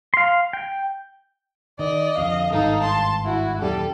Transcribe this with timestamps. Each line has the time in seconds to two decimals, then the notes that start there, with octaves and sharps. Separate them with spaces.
0.14 F5 C6
0.53 G5
1.79 D#3 D5 D#5
2.18 F2 D3 F5
2.52 G#1 G2 D#4 A4
2.81 A5 C6
3.25 E4 F#4
3.62 D#1 F#2 G3 A4